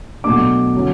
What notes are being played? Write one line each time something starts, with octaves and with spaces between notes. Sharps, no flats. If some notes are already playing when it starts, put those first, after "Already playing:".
B2 F#3 A3 D4 D6
D3 F#3 C#4